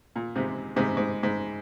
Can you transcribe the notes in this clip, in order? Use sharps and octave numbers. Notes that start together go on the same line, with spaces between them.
A#2
G#2 C3
G#2 C3
G#2
G#2